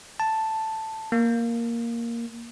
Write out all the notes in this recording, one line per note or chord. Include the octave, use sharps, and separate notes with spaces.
A5
A#3